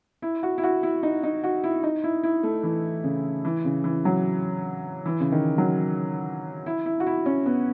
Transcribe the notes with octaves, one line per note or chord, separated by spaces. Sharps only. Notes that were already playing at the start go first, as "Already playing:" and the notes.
E4
F#4
E4
F#4
E4
D#4
D#4
F#4
E4
D#4
E4
E4
A3
E3
C#3
E3
C#3
E3
F#3
E3
C#3
D#3
F#3
E4
E4
F#4
E4
C#4
B3